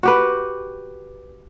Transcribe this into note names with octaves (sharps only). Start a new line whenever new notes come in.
F#4 G4 B4